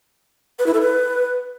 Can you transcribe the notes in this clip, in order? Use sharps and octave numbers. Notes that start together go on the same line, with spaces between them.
B4
E4
A4
B4